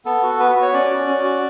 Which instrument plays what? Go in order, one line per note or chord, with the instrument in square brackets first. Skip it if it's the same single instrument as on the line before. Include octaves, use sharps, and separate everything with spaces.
[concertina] B3 A4
F#4
B3 B4
F#4
C#5
C#4 D5
F#4
C#4
F#4